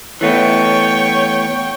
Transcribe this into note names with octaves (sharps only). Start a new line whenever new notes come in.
E3 A3 B3 C#5 G5